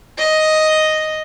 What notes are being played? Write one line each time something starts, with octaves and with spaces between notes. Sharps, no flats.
D#5